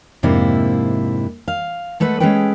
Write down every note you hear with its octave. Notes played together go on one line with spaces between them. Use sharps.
F2 G#2 C3 A#3 D4 E4
F5
G#3 A3 A4 B4 F#5
G#3 C#4 G#4 A4 B4 G5